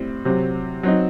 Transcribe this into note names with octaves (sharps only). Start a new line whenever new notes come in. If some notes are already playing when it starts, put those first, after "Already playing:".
Already playing: A2 G3 C4
C3 F#3 C4
F#3 C4 D#4